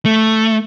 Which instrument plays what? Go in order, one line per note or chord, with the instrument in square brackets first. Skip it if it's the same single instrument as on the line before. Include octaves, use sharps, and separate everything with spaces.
[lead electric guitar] A3